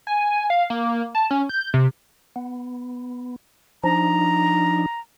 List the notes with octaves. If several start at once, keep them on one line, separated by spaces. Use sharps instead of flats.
G#5
F5
A#3
A5
C#4
G6
C3
B3
F3 D4 D#4 A#5